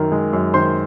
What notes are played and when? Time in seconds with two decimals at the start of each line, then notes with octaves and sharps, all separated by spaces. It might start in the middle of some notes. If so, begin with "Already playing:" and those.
Already playing: F#2 D#3 A#4
0.12 G#3
0.33 F#2
0.54 D#3 C5 C6